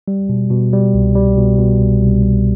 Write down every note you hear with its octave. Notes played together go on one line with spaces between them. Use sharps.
G3
B2
B2
G3
C2
G3
B2
B2
C2
C2
C2